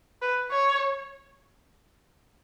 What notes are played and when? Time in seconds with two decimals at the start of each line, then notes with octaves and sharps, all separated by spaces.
0.22 B4
0.51 C#5